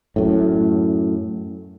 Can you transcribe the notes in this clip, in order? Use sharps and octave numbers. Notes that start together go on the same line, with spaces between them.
F#2 A2